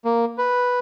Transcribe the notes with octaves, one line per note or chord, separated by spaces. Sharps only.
A#3
B4